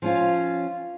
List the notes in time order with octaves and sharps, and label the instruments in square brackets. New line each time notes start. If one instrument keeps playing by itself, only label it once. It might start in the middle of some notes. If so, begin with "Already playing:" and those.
[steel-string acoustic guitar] F3 C#4 F4